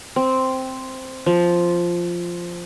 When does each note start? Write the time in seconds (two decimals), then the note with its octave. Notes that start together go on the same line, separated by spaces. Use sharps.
0.16 C4
1.26 F3